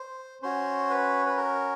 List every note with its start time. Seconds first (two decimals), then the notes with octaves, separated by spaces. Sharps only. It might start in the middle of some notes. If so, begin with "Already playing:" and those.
Already playing: C5
0.42 C#4 F#4 C5
0.90 B4
1.26 B4
1.37 A#4